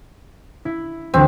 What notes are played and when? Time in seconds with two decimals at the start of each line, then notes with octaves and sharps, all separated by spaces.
0.65 E4
1.14 D2 E3 F#3 C4